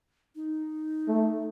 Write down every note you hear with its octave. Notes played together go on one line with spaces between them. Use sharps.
D#4
A3